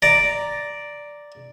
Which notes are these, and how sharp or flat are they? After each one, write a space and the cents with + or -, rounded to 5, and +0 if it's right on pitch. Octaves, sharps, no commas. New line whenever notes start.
D5 +0 A#5 +0